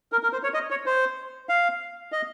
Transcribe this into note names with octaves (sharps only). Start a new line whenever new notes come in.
A#4
A#4
C5
C#5
D#5
C#5
C5
F5
D#5